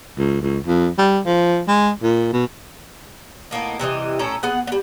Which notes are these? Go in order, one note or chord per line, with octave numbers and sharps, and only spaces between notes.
C#2
C#2
F2
G3
F3
G#3
A#2
B2
A2 A#3 B3 D#4
C3 E3 G3 D#5
A2 C#4 A4 A#5
B3 G#4 F#5
G3 B3